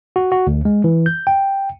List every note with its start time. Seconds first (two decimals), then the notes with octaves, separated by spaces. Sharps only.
0.16 F#4
0.32 F#4
0.47 D2
0.65 G#3
0.84 E3
1.06 G6
1.27 G5